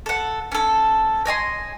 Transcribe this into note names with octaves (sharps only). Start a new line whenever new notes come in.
A4 F#5
C#4 A4
C#5 D#5 G#5 C6